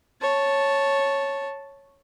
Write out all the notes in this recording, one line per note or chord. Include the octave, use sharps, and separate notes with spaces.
C#5 A5